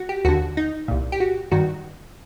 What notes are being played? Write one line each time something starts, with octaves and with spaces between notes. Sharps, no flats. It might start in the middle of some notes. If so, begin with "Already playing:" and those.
Already playing: F#4
G4
D#2 D3 F#4
D#4
C2 A#2
G4
F#4
G2 D#3 F#4